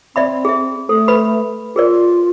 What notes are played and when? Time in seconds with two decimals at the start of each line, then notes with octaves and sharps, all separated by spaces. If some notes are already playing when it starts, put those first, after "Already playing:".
0.16 C4 D5 E5 B5
0.45 G#4 E5
0.89 A3 A4
1.08 B4 B5
1.76 F4 G#4 A#4 D5